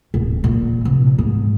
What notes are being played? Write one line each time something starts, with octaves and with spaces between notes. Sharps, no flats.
D#1
A#2
F1
G#2